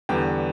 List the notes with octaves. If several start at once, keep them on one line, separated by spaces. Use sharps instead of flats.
E2 D3 G3 B3 G5